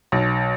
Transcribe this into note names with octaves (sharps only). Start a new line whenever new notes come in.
B1